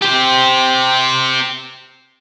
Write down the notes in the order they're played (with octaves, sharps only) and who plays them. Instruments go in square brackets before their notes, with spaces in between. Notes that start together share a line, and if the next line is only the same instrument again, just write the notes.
[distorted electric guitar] G4 C5